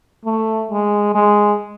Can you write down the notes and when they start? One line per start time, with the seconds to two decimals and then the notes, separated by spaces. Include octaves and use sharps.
0.25 A3
0.70 G#3
1.14 G#3